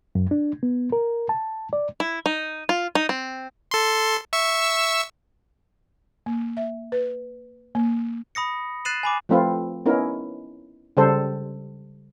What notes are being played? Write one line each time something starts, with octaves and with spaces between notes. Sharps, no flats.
F#2
D4
B3
A#4
A5
D5
E4
D#4
F4
D#4
C4
A4 C6
E5 C#6 E6
A#3
E5
B4
A#3
B5 D#6 A#6 C#7
F#6 A6 C7 D#7 E7 F#7
G#5 B5 D6
F3 A3 C4 F4 B4
B3 C#4 D#4 E4 A#4
C#3 G3 A4 C5